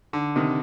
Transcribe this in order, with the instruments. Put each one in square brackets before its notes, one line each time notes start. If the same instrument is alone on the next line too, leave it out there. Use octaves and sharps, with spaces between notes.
[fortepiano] D3
C3 D#3